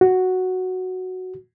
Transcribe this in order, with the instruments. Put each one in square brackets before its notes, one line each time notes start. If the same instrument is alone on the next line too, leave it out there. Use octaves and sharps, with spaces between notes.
[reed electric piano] F#4